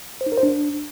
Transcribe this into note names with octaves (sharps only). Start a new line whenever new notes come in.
C5
D#4
A#4
C5
D4